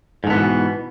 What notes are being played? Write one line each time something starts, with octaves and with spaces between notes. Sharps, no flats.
G#2 B2 D3 E3 B3